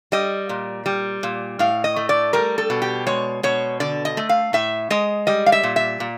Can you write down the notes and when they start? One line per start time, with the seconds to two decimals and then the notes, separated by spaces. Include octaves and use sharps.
0.12 G3 D#5
0.49 A#2
0.86 G3
1.23 A#2
1.59 A2 F5
1.84 D#5
1.96 A3
2.09 D5
2.33 G3 A#4
2.58 A4
2.70 B2
2.82 G4
3.07 G#3 C#5
3.43 B2 C#5
3.80 D3 D5
4.05 D#5
4.17 A3
4.29 F5
4.53 A2 E5
4.90 G#3 D#5
5.27 G3 D#5
5.46 F5
5.52 E5
5.63 A#2
5.76 E5
6.00 A#2